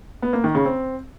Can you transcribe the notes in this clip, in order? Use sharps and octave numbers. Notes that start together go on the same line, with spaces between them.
B3
A#3
D#3
C#3
C4